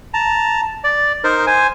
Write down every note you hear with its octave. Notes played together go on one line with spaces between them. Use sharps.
A5 A#5
D5
D#4 A#4 C5
C5 G#5